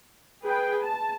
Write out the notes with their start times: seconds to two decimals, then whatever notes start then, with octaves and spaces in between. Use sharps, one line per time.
0.44 G#4 B4 G5
0.84 A5